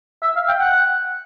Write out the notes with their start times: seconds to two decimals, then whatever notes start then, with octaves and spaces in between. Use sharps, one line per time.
0.23 E5
0.36 F5
0.48 G5
0.60 F#5